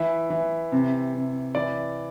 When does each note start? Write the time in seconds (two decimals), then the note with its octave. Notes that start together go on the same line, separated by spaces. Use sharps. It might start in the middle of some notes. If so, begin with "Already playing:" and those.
Already playing: E3 E5
0.30 E3
0.72 C3
1.14 C3
1.55 E3 D5